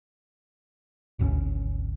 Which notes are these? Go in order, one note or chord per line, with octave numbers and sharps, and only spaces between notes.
G#1 D2 C4 C#4